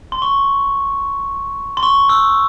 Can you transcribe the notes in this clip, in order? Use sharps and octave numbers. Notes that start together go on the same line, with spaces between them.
C6
C#6
C6
C#6
E6